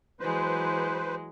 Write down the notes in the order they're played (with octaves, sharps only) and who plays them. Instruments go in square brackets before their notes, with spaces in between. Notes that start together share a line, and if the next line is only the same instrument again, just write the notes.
[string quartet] E3 F#3 G#3 [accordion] B4 C5